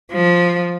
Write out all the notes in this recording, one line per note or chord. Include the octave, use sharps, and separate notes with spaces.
F3